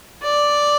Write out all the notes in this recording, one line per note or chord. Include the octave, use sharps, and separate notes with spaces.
D5